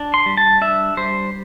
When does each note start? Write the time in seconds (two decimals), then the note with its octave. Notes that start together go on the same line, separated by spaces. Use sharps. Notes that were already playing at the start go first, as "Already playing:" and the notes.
Already playing: D4
0.14 C6
0.26 G3
0.37 A5
0.61 D4 E5
0.97 G3 C5